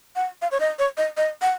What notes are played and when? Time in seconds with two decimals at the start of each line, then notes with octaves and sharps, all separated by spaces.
0.16 F#5
0.42 F5
0.51 C#5
0.60 D#5
0.79 C#5
0.97 D#5
1.17 D#5
1.42 F#5